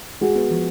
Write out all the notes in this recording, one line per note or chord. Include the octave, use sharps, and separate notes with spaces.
G#3 F#4 G#4
B3
F3